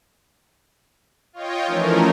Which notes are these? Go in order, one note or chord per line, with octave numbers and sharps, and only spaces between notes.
F4 C#5 D#5 G5
E3 F3 A3 C#4 D#4 A#4